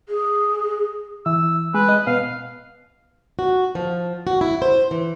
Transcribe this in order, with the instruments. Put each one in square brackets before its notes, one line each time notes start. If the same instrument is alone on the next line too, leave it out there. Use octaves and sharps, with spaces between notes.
[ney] G#4
[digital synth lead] E3 [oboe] E6
[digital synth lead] G#3 [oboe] B4
[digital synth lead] D#5
[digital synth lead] B2 [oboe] F5
[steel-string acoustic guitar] F#4
F3
F#4
E4
C5
E3